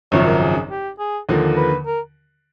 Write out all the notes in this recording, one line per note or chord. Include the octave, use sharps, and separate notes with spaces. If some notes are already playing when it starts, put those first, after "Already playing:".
G#1 F#2 C#3 F3 C#5
A#4
G#4
G4
G#4
D#2 D3 F3 A#3
B4
A#4